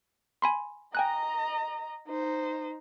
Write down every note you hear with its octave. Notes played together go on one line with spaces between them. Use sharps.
G#5 B5 C6
D#5 G5 G#5 A#5 F#6
D#4 C5